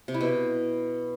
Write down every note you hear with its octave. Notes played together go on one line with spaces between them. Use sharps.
C3
E4
B2